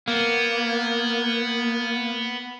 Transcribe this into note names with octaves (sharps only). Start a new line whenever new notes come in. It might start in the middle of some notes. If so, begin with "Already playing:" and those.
A#3 B3